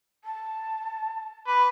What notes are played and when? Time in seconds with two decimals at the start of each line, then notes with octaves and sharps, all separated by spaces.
0.24 A5
1.47 B4 D6